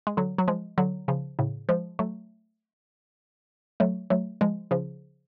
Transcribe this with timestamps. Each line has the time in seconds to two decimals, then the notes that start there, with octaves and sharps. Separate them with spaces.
0.07 G#3
0.17 D3 F#3
0.38 F#3
0.48 F3 G#3
0.78 D3 F#3
1.08 C#3 F3
1.39 A2 C#3
1.69 F3 G#3
1.99 F#3 A3
3.80 F#3 A3
4.10 F#3 A3
4.41 F3 G#3
4.71 C#3 F3